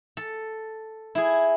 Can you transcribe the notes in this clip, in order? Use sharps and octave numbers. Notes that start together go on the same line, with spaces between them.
A4
E4 G#4